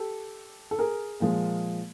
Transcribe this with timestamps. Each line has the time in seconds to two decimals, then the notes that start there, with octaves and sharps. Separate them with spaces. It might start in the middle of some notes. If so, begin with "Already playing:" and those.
Already playing: G4 A4
0.71 A4
0.79 G#4 A#4
1.20 A#2 F3 G#3